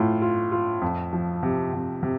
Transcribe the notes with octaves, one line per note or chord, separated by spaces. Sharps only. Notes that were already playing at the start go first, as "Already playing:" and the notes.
Already playing: A2 A3 F4
F4
F4
F2
F3
C3
C3
C3